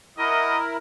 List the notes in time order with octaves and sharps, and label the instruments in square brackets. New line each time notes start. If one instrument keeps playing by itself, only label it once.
[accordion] E4 A#4 [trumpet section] F#4 D#5